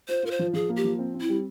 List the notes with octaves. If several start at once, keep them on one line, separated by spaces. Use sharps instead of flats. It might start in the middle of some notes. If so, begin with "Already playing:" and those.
F4 C5
F4 A#4
C5
F3
F3 G#4
A#3
G4
F3
C4
C4
E4
G3